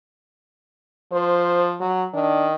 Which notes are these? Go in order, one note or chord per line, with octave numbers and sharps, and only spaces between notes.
F3 C5
F#3
D#3 D4